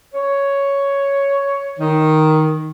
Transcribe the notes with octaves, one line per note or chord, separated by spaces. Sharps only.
C#5
D#3